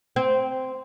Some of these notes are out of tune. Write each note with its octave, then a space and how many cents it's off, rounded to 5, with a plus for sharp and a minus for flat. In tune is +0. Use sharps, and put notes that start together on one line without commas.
C4 -10